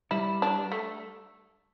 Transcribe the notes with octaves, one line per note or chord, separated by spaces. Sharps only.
G3 E4
D4
A3